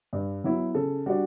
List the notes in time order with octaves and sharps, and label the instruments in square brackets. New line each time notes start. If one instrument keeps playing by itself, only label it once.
[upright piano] G2
F#3 B3 E4
C#3 A4
G3 D4 F#4